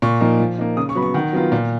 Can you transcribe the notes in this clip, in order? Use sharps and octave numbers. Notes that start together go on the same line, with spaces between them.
A#2 C#6
F3 A#3 D#4
F3
A#3 D#4
C#3 D#6
C#6
F#3 B3 B5
C#6
D#3 F#5
F#3 B3 F4
A#2